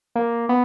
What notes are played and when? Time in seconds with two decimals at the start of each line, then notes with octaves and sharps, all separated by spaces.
0.15 A#3
0.49 B3